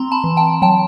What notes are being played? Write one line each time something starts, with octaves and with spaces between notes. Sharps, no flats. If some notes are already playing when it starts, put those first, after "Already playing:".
Already playing: C4 A#5 C6
A5 B5
E3
G5 A5
F#3 G5 A5